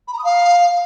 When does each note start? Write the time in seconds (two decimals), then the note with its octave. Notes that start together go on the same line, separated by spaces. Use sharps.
0.08 B5
0.13 A#5
0.19 D#6
0.24 F5